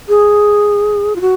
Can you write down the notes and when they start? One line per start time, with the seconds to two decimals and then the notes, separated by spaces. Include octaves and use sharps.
0.08 G#4
1.16 F4
1.21 F#4